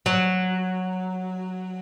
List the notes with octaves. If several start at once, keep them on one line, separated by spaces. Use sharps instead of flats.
F#3